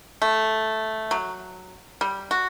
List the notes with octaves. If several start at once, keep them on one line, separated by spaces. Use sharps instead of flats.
A3
F#3
G3
F#4